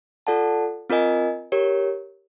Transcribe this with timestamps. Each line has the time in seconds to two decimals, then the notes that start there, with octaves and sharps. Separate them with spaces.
0.27 F4 A4 D5 F#5 A5
0.90 C4 F4 A#4 D#5 G#5
1.52 G4 A#4 C#5